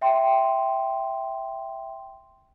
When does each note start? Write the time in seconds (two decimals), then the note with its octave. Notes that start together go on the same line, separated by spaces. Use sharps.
0.01 E5 G5 C6